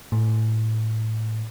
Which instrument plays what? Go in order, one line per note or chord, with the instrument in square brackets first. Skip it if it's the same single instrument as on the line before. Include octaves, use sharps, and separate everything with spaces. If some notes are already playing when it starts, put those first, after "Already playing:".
[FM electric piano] A2